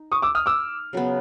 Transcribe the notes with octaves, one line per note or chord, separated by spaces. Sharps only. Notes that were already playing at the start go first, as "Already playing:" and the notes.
Already playing: D#4
C#6 D#6
D6 E6
D#6 F6
D6 E6
C#3 F#3 B3